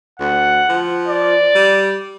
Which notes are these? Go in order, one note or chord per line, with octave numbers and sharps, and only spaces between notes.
D2 F#5
F3
D5
G3